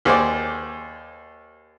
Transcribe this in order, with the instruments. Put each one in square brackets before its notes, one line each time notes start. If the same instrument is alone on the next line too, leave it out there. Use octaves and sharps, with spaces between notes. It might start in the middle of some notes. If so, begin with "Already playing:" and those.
[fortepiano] D#2 G#4 C5 D5